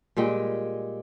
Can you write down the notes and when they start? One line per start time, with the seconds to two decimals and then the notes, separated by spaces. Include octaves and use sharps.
0.17 A#2 G3 G#3 G5